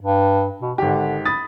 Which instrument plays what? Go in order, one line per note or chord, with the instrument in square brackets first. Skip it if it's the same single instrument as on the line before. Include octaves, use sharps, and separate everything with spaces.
[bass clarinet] G2
B2
[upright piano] G#1 G4 [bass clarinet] D3
[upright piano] B5 D#6 A6